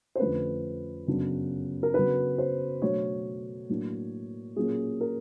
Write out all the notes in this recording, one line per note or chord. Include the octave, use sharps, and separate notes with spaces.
C5
F2 D3 F3 A3 C#4 B4
F#2 C#3 F#3 B3 D4
A#4
C#3 F#3 B3 D4 B4
C5
B2 F#3 A3 D4 C#5
A2 F#3 A#3 D4
A#2 F#3 A#3 C#4 G#4
A#4